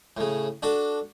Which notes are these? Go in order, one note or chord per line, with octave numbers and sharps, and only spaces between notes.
A2 C#3
D4 F#4 A4